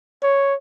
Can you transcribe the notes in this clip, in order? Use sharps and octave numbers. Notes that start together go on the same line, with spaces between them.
C#5